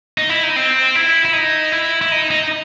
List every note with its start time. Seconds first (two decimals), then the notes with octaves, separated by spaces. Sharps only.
0.18 D#4
0.29 E4
0.43 D#4
0.56 C4
0.95 E4
1.25 E4
1.33 D#4
1.72 E4
2.01 E4
2.12 D#4
2.31 D#4